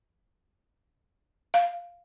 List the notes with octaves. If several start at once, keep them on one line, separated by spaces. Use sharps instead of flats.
F5